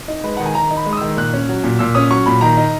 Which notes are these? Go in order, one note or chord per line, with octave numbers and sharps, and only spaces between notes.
D#4
G#3 B4
D#3 F#5
G#5
D#3 A#5
D#4
B5
G#3
D#6
D#3 E6
A#2 F#6
C#4
F#3
A#2
A#2 E6
C#4 D#6
F#3 C#6
A#2 B5
D#3 A#5
D#4